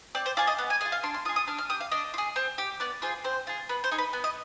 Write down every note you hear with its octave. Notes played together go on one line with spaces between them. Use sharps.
C4 D5
C5
F4 G#4 D5
D#5
B3
G#5
F4 G#4 G#5
F5
D4 C6
C6
F4 G#4 D#6
D#6
D4 F6
F6
G4 D#6
F5
D4 D#5
F4
G#4
C4
G4
B3 D5
F4 G#4 C5
C4 C5
F4 G#4
B3 B4
C5
D#4 G#4
B4
B3
D#5